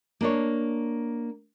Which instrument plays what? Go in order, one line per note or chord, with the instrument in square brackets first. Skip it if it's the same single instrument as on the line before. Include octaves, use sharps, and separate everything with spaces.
[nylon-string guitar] A#3 D4 C#5